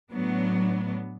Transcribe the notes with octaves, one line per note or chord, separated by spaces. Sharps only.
A2 F#3 B3 D4